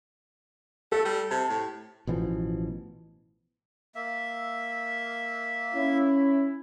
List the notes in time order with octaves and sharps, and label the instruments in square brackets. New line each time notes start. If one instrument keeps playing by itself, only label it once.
[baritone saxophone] A3 [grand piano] A4
[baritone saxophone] G3
[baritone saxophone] C3 [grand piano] A5
[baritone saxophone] A2
[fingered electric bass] A1 B2 E3 F3
[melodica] A#3 E5
[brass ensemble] C#4 E4